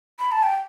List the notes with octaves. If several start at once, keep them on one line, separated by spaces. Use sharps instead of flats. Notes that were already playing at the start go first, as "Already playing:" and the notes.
B5
A5
G5